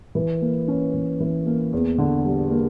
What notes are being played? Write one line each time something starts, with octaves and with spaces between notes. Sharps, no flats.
E3
A#3
C#4
E3
E3
A#3
E2
D3
G3
A#3